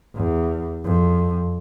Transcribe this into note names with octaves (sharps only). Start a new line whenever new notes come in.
E2
F2